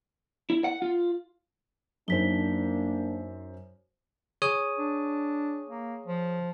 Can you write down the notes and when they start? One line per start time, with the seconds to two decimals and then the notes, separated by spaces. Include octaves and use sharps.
0.50 E4
0.64 F#5
0.82 F4
2.08 F#2 A#3 D4 D#4 C5 B6 G7
4.42 G#4 C#5 D#6
4.78 D4
5.69 A#3
6.06 F3